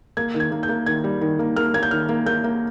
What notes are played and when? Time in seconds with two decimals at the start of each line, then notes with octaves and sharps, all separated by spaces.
0.17 A#3 G#6
0.34 D#3
0.40 G#6
0.52 A#3
0.63 G6
0.69 A#3
0.86 D#3 G#6
1.04 G3
1.21 D#3
1.39 A#3
1.56 A#3 F6
1.74 A#3 G#6
1.83 G6
1.91 D#3 F6
2.09 A#3
2.26 A#3 G6
2.44 A#3